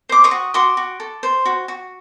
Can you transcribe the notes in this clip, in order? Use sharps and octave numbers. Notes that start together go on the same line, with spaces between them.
C5 D6
C#6 D#6
F#4
F#4 C6 D6
F#4
A4
C5
F#4
F#4